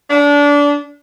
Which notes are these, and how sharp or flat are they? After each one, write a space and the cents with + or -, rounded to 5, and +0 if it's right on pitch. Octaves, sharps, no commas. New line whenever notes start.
D4 -25